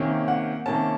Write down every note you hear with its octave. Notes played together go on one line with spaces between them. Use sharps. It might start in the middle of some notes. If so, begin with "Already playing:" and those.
Already playing: C3 D#3 A#3 C#4
F#5
C3 D#3 A#3 C#4 A5